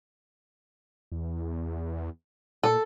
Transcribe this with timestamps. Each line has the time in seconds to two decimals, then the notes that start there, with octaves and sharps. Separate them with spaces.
1.12 E2
2.63 A#2 A4